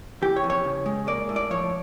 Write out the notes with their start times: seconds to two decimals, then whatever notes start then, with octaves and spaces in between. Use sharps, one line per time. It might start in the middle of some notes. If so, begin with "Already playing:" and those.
0.22 E3 G4
0.36 C#5
0.44 F2
0.50 C#5
0.65 C#3
0.86 G#3
1.08 A#3 D5
1.29 A2
1.36 D5
1.50 F3 C#5